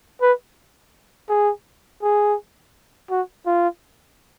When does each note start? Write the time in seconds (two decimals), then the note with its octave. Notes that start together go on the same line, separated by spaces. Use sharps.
0.22 B4
1.29 G#4
2.03 G#4
3.10 F#4
3.46 F4